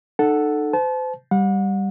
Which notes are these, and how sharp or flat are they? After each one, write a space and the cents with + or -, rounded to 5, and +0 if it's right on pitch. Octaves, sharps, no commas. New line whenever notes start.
D#4 -40 A4 +0 F#5 +0
C5 -35 A5 -30
G3 +0 F#5 -35